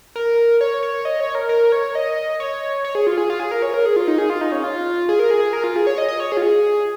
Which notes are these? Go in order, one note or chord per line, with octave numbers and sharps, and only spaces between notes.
A#4
C#5
C#5
D#5
C#5
A#4
A#4
C#5
D#5
C#5
C#5
G#4
F4
G#4
F4
G#4
A#4
C#5
A#4
G#4
F4
D#4
G#4
F4
D#4
C#4
F4
G#4
A#4
G#4
A#4
F4
G#4
C#5
D#5
D#5
C#5
G#4
F4
G#4